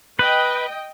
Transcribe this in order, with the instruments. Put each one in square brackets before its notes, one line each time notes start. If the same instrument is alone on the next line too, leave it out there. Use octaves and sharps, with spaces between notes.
[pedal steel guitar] B4 [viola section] D#5 G5